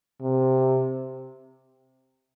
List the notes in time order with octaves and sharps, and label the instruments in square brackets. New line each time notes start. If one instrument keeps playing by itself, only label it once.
[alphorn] C3